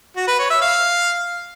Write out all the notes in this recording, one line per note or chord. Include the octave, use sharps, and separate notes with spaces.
F#4
B4
C#5
E5
F5